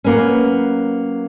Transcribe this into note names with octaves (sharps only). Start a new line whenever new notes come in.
F#3 A#3 B3 C#4